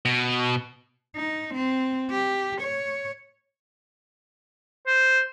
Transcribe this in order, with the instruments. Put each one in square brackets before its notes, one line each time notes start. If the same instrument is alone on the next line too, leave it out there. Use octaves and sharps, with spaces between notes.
[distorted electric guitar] B2
[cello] D#4
C4
G4
C#5
[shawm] C5